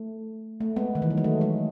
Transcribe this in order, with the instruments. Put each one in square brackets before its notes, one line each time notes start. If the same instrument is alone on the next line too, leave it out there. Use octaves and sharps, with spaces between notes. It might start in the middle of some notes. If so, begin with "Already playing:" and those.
Already playing: [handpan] A3
A3
G#3 B3
D#3
E3
F#3
G#3
A3
G#3